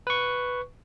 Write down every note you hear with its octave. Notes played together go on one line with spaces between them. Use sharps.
B4 C#6